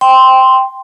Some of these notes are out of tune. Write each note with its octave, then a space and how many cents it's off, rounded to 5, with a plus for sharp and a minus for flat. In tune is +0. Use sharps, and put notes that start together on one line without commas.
G5 +0 C6 -5